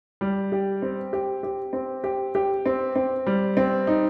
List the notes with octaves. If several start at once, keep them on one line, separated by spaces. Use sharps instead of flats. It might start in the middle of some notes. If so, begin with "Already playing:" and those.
G3
G4
C4
G4
G4
C4
G4
G4
C4
C4
G3
C4
D#4